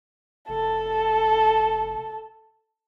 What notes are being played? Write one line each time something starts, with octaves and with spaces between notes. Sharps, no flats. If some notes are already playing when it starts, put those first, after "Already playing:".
F1 A4